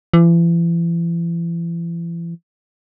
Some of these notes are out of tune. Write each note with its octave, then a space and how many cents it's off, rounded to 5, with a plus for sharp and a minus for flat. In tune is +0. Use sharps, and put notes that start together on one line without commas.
E3 +40